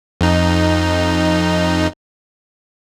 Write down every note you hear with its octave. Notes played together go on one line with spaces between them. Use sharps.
F2 D#4